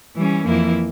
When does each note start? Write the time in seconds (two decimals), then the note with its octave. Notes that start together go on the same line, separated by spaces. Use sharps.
0.16 E3 G3 C#4
0.47 F2 E3 A#3 E4